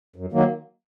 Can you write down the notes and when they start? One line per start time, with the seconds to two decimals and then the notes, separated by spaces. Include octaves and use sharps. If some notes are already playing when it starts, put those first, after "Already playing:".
0.16 F#2
0.32 D#3 F#3 A#3